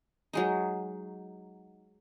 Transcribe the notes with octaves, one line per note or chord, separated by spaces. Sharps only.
F#3 G#3 D#4